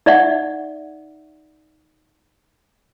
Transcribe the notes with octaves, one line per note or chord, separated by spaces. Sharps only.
D#4 D5 E5 F#5